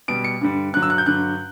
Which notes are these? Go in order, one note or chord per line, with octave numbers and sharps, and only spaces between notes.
B2 G3 D7
C#7
G2 D3 G3
G2 D3 F#3 F#6
E6
F#6
G6
G2 D3 F#3 F#6